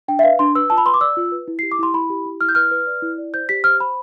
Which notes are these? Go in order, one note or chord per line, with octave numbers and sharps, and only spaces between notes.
D4 G5
E5
B4 F5
D4 C6
B4 E6
F4 A5
B5
B4 C6
D6
D5 E6
F4
B4
E4
C7
G4
D6
E4 C6
E4 B5
G4
E4
E4 F6
G6
B4 F6
B4
D5
E4
D5
C5 G6
G4 B6
C5 F6
C5 B5